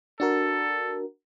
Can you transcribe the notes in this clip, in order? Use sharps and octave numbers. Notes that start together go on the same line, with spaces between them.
D4 F#4 A4 A#4